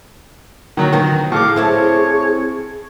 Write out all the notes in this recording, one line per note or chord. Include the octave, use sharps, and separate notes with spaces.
D3 D#3 F#3 A#5
D#3 F#3 B3
A2 G#4 F5 D6
C4 E4 A4 C#5